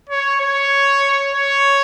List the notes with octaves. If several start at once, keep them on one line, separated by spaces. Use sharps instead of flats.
C#5
C#5
C#5